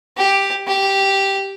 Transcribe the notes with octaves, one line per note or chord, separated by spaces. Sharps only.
G4
G4